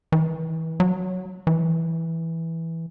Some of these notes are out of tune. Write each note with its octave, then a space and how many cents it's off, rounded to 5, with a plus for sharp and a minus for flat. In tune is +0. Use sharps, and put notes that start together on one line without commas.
E3 -30
F#3 +0
E3 -5